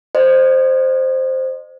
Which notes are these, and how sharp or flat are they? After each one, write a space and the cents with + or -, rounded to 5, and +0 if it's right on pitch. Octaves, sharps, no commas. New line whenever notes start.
C5 +0 D#5 -35